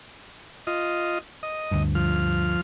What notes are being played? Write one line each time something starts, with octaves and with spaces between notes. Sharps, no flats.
F4 D#5
D#5
D2 G2
F3 F6